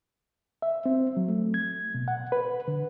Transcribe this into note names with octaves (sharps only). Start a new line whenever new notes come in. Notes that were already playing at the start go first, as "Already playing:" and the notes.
E5
C4
F#3
A3
G#6
B2
F#5
B4
D3